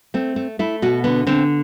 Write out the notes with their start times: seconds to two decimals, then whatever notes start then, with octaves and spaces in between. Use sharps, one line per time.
0.14 A3 C4
0.36 A3
0.59 A3 E4
0.82 B2 F#4
1.04 D3 B3
1.27 D3 C4